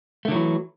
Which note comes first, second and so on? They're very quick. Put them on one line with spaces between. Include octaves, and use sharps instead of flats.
A3 D3 F#3 E3